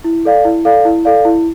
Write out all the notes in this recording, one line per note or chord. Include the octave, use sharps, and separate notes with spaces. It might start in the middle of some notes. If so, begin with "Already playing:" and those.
E4
A4 D5 F5
E4
A4 D5 F5
E4
A4 D5 F5
E4